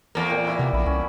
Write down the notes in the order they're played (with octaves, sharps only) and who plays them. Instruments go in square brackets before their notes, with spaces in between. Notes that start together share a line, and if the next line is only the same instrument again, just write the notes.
[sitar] E2 A#3
[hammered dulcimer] A#2 G5
E4 D5 F5
[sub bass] C3 [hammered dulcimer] B3
[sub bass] A#1 [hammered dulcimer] E5 B5
[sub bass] C2 [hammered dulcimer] C#4